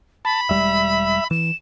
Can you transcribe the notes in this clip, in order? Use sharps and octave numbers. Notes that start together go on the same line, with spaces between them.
A5 B5
E1 G3 G#3 E5
E3 E7